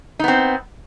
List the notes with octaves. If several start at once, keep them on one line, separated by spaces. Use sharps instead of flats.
B3 C4 D#4